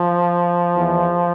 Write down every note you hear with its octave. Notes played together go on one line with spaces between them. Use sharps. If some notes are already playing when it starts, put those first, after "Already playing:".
Already playing: F3
E2 E3